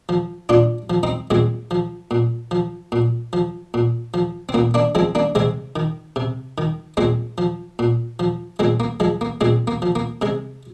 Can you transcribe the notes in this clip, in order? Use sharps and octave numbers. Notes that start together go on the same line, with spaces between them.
F3
A#2 D4 F4
F3
C4 D#4
A#2 G#3 C4
F3
A#2
F3
A#2
F3
A#2
F3
C4
A#2 A#3
A#3 D4
F3 G#3 C4
A#3 D4
C3 G#3 C4
D#3
C3
D#3
A#2 G#3 C4
F3
A#2
F3
A#2 G#3 C4
A#3
F3 G#3
A#3
A#2 G#3 C4
A#3
F3
A#3
C3 G#3